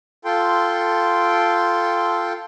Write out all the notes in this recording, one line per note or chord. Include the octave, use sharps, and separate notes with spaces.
F4 A4 G5 C6